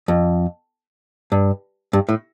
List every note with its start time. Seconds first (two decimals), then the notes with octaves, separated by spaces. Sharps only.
0.08 F2
1.32 G2
1.93 G2
2.09 A2